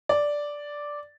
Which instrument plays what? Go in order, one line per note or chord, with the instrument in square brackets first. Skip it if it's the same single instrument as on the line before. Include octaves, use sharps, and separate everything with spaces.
[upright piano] D5